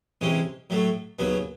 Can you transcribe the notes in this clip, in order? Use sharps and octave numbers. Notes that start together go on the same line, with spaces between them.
C3 E3 G#3 C#4
A2 F#3 A3
D#2 C#3 F#3 B3